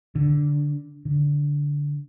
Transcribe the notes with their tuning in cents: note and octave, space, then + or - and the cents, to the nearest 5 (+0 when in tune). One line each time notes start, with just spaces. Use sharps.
D3 -5
D3 -15